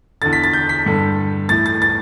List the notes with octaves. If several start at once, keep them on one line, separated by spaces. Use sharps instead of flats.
E2 D3 A6
B6
A6
G6
B6
G2 D3
A2 E3 A6
A6
A6